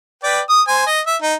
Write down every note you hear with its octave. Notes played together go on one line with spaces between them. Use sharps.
B4 D5 G5
D#6
C5 G#5
D#5
E5
D#4